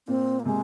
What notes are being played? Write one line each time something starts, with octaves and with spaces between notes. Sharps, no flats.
A#2 C4
A#3
C3 G#3